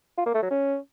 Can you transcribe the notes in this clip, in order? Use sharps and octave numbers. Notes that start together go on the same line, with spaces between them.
F4
A#3
A3
F#3
C#4